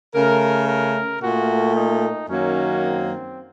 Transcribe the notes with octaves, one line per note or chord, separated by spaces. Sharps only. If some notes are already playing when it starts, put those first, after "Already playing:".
C#3 A3 A#4
A#4
A#2 A3 F#4
D#4
F#2 D#3 F#3 A#3 C#4
C4